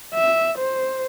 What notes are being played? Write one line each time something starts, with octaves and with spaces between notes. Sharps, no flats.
E5
C5